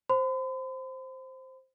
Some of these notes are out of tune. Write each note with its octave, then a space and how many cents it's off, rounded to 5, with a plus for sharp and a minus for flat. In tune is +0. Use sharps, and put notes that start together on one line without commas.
C5 +0 B5 +45